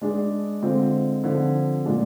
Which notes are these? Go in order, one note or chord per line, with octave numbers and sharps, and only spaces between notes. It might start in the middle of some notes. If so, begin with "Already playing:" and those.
G#3 D4 G#4
D3 G#3 C4 F4
D3 F3 C4
A#2 G#3 D4 F4 G#4